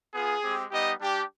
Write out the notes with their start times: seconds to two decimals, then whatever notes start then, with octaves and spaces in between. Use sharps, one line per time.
0.14 B3 F4 G#4
0.43 G#3 C4 G4
0.71 G3 B3 D#4 G4 D#5
0.99 G3 D4 G4